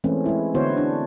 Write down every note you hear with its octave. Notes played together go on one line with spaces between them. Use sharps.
E3 G#3 A3 C4 C#4
G#3 E4
D3 B3 E4 F#4 C5 C#5
D4